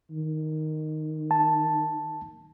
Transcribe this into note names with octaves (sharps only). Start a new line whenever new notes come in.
D#3
A5